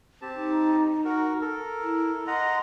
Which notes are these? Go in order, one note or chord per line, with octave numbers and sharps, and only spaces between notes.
C4 G4 A5
D#4
F#4 A#4
A4 A#4
E4
D#5 F#5 A#5 C6